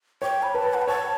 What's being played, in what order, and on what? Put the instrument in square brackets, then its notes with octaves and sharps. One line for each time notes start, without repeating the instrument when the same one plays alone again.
[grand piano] C#5 [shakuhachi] G5
[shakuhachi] B5
[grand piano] B4 [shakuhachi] A5
[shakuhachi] F#5
G5
[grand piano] C#5 [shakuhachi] A5